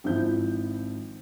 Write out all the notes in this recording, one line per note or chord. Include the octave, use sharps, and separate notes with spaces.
G#1 F3 E4 G6